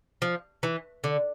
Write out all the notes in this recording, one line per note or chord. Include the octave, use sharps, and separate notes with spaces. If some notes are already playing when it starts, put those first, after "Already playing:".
F3
E3
D3